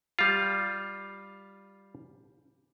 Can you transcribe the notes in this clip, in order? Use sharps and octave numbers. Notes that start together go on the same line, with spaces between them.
G3 F4